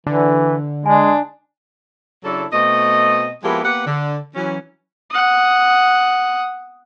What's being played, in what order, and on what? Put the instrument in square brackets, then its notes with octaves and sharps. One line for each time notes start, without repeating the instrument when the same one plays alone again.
[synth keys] D3 [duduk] E3
[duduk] G#3 [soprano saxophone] D4 [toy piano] G#5
[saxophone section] C#3 F#3 D4 E4 A4
B2 A3 C4 D#5
F3 G#3 A#3 B3 E4 G4
A#3 B3 G4 B4 F#5
D3
E3 F#3 C#4
[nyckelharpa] F#5 D#6